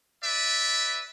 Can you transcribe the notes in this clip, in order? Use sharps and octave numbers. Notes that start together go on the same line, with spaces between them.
B4 D5 E5